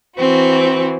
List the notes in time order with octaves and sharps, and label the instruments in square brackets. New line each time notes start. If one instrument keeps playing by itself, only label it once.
[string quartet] E3 C4 F#4